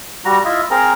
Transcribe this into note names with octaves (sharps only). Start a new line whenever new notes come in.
G3 F#4 A#5
E4 F4 D#5 E5
C4 G#4 A#4 A#5